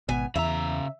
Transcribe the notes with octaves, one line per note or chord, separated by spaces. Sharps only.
G#1 B2 B3 G#5
E2 C#3 E5 A#5